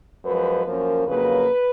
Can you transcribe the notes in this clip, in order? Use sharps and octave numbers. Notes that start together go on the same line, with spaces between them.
F#2 F3 G#3 B4
F#2 F3 A#3 C#4 A#4
F2 C#3 F#3 A#3 B4